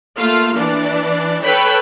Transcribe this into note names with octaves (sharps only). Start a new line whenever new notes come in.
A3 A#3 F4 F5
E3 D4 D5
A4 B4 C#5 G5 B5